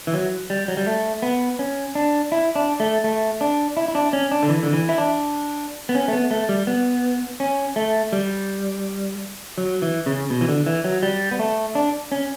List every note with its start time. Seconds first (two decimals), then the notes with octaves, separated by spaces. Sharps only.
0.07 E3
0.13 F#3
0.50 G3
0.68 F#3
0.77 G3
0.86 A3
1.22 B3
1.59 C#4
1.95 D4
2.32 E4
2.56 D4
2.80 A3
3.04 A3
3.41 D4
3.77 E4
3.88 E4
3.95 D4
4.13 C#4
4.31 D4
4.43 D3
4.49 E3
4.63 D3
4.73 E3
4.89 E4
4.98 D4
5.89 B3
5.95 C#4
6.08 A3
6.13 B3
6.31 A3
6.49 G3
6.67 B3
7.40 C#4
7.76 A3
8.13 G3
9.58 F#3
9.82 E3
10.06 C#3
10.30 B2
10.41 E3
10.48 D3
10.66 E3
10.84 F#3
11.03 G3
11.31 B3
11.39 A3
11.75 D4
12.12 C#4